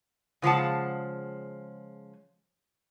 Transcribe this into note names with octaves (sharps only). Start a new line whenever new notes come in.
C#3 F3 G#3 F#5 A5